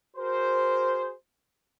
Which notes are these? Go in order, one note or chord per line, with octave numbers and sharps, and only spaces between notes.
F#4 G#4 A#4 C5